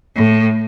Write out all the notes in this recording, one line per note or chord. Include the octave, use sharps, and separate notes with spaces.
A2